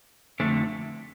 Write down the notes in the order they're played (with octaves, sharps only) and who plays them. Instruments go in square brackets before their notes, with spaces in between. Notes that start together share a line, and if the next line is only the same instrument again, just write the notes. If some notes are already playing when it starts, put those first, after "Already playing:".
[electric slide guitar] F2 D3 A3 C4